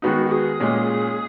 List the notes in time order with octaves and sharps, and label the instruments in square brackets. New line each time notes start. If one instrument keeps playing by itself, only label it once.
[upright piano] D#3 G#3 B3 D#4 [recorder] F#4
[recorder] F#4
G#4
[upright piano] A#2 G#3 C#4